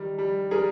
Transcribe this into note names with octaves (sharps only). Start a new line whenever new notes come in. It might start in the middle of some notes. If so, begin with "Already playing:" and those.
Already playing: D#3 G3
G3
G3 G#4 A#4